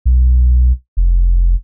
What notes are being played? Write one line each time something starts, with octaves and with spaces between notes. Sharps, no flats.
B1
F1